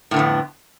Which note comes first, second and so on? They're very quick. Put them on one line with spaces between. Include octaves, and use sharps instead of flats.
A2 D3 B3 F2